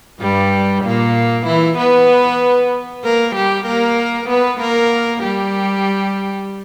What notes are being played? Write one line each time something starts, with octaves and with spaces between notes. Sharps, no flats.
G2 G3
A#2 A#3
E3 E4
B3 B4
A#3 A#4
G3 G4
A#3 A#4
B3 B4
A#3 A#4
G3 G4